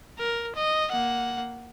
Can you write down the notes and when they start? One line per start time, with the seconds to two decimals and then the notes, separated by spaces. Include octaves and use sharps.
0.19 A#4
0.56 D#5
0.92 A#3 F#5